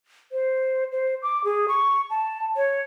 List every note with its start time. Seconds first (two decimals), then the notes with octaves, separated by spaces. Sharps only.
0.32 C5
0.92 C5
1.23 D6
1.44 G#4
1.68 C#6
2.10 A5
2.56 C#5